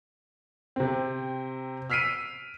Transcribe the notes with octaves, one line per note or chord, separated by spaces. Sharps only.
C3 C4
E6 F6 B6 C7 D7 D#7